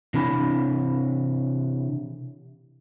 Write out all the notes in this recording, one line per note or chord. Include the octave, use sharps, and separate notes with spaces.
C3 E3 D4 B5